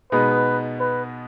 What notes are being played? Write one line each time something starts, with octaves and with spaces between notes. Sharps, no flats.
B2 G#3 B3 D#4 B4
B4